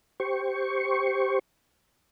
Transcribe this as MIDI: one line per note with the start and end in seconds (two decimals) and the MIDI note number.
0.20 1.39 67
0.20 1.39 72
0.20 1.39 85